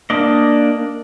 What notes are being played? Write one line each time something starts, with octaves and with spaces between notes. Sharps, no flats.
A#3 D4 D5 D#5